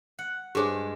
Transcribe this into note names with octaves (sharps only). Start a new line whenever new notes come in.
F#5
G2 G#3 G4 G#4 C5